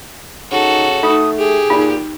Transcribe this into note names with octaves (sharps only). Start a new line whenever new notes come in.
C#3 D#4 F#4 A4
A3 D#4 D#6
G4 G#4
A#2 D#4